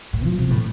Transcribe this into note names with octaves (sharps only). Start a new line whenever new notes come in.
A2
F3
C3
A2